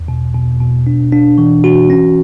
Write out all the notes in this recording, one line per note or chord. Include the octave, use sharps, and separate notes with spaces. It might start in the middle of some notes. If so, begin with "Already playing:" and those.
Already playing: E2
B2
B2
B2
D4
D4
E3
F#4
C#4